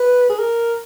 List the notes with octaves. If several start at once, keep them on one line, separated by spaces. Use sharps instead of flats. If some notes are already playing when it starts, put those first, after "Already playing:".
Already playing: B4
G#4
A#4